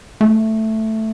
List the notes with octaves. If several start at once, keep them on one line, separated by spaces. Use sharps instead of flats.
A3